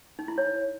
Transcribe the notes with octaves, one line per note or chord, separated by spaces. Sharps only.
D#4
E4
C#5